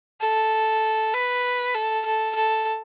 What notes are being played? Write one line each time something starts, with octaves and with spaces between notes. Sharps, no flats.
A4
B4
A4
A4
A4